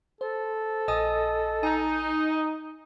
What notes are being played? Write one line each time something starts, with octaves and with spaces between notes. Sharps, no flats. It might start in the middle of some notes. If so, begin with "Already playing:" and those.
A4 C5
A#1 D#5 G#5 D#6
D#4 G#5 A#5